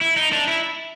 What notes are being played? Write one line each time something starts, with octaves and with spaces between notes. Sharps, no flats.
E4
D#4
D4
E4